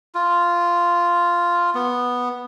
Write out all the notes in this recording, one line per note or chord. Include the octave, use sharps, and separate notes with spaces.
F4
B3